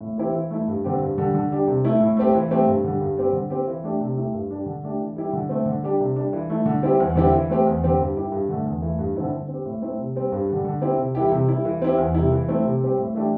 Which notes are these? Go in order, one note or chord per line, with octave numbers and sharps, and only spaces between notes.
A2
E3 C4 E4 G4
E3
A3 E4
G2
D3 C4 G4
G2
D3 G3
D3
G3 D4 G4
C3
A3 E4
A2
A3 C4 G4
E3
A3 C4 G4
G2
D3 G3
G2
G3 C4 G4
D3
C4 G4
E3
A3 D4 G4
C3
A3 E4 G4
G2
G3 D4
D3
A3 D4 G4
E3
G3 E4 G4
D3
A3 C4
D3
G3 D4 G4
C3
G3 D4
E3
A3 E4
D3
G3 C4 E4 G4
E2
D3 C4 E4 G4
E3
A3 C4 G4
E2
D3 C4 G4
G2
G3 E4 G4
G2
D3 A3
E2
E3 A3
G2
D3 C4 E4
D3
C4 G4
A2
A3 C4 E4
C3
G3 C4
G2
D3 G3
D3
C4 E4 G4
C3
E3 G3 E4 G4
C3
E4
G3
E3
C4 E4 G4
E2
C3 G3 E4
E3
A3 C4 E4
C3
G3 C4 G4
A2
E3 A3 D4 G4